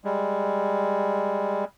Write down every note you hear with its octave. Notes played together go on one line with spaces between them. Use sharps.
G3 G#3